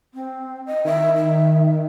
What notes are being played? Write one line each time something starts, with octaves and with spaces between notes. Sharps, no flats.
C4
D#5
D#3 E5
E5